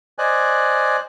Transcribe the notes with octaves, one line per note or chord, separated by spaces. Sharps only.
C5 D5 D#5 G#5 F#6